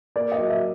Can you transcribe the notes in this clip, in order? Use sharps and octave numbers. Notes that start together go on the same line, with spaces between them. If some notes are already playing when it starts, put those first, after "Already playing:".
A#3 D5
D#5
F#3
E5